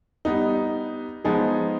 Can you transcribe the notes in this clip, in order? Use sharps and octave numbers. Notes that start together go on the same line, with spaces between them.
G3 B3 D#4
F3 G#3 B3 D#4 G#4